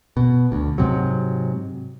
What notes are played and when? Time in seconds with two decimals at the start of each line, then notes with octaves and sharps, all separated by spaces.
0.17 B2
0.52 D2
0.78 G#2 C3 F#3